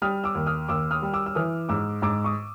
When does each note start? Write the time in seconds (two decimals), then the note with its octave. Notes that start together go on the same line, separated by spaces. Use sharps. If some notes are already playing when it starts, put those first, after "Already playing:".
0.02 G3 D#6 F6
0.24 D6 E6
0.35 D#2
0.47 D#6 F6
0.69 D#2 D6 E6
0.91 D#6 F6
1.02 G3
1.13 D6 E6
1.26 E6
1.35 E3 D#6 F6
1.69 G#2 D6 E6
2.02 G#2 D6 E6
2.24 C#6 D#6